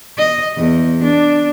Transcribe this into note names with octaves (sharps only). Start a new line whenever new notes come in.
D#5
E2
D4